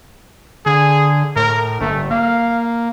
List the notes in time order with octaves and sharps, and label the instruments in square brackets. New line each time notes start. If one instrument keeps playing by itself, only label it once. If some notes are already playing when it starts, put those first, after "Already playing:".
[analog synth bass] D3 [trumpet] G#4
[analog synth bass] A2 [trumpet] A#4
[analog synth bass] G1 [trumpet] A3
[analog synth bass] A#3 [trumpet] F5